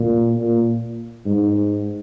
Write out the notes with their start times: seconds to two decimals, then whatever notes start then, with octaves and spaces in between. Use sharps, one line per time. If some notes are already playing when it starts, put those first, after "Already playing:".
Already playing: A#2
0.38 A#2
1.26 G#2